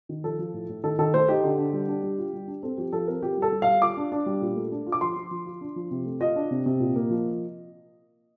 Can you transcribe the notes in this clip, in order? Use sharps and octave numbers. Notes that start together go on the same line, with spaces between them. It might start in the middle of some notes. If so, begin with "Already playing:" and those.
D#3
F3 A4
F3
A2
A2
D#3 A4
D#3 A4
A3 C5
D#4 G4
D3
D4
G3
D4
G3
F4
G3
D4
C4 A4
F3 G4
F3 A4
C4 A#4
F4 G4
G3 A4
G3
F5
G3
F4 D6
D4
D4
G3
A#2
A3
D4
F4
D6
F3 C6
F3
F3
F4
D4
F3
C3
A3
F4 D#5
D4
C3
C3
A#2
A#3
F3